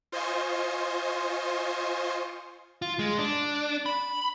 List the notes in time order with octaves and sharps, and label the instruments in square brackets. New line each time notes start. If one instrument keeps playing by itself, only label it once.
[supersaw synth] F4 C5 D#5 G#5 C6 C#6
[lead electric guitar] F4
G#3
D4
B5